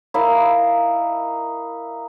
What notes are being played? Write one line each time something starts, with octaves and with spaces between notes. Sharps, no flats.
E4 A#4 D#5 F5